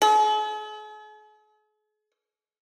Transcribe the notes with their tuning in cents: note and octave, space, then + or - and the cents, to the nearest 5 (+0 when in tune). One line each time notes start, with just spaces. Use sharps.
G#4 +45